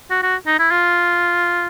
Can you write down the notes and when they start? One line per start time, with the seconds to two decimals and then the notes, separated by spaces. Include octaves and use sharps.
0.10 F#4
0.23 F#4
0.47 D#4
0.59 E4
0.71 F4